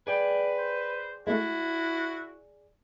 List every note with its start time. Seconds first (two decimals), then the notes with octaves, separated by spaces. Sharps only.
0.07 G#4 B4 D5 G5
0.58 C5
1.27 G#3 A3 E4 F#4